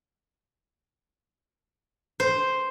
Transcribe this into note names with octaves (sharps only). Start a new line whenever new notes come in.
C5